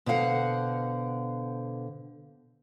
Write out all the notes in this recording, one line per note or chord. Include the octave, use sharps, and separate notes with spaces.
B2 D3 C5 F5 F#5